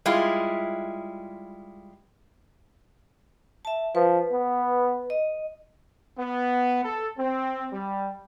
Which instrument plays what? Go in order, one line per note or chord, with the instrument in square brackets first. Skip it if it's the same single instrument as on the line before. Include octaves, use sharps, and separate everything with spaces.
[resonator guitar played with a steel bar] G3 G#3 E4 F4
[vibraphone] E5 A5
[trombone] F3 [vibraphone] B4
[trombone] B3
[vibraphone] D#5
[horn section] B3
A4
C4
G3